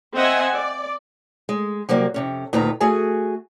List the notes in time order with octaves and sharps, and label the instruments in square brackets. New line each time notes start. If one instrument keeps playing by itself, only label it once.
[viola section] C4 C5 D#5 E5 F#5 G#5
D5
[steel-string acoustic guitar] G#3
C3 F#3 G3 A#3
F2 C3 C#4
D2 A#2 D#3 B4 A#5
A3 F#4 G#4 G#5